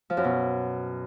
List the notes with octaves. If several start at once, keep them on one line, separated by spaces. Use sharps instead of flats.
F3
F#2
B2